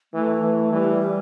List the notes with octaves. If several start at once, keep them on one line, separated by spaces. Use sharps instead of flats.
E3 A3
E3
E3 G3